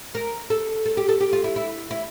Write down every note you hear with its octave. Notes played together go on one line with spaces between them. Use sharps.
A#4
A4
A4
G4
A4
G4
F4
E4
E4
E4